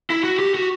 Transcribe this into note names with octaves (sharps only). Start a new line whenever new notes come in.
E4
F#4
G4
F#4